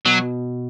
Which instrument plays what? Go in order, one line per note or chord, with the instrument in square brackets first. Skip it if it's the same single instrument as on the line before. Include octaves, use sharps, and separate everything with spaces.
[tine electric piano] B2 [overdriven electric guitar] F#3